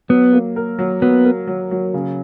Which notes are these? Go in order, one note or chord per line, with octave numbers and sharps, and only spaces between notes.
F#3 B3
A#3
A#4
F#3
F#3 B3
A#4
F#3
F#3
C#3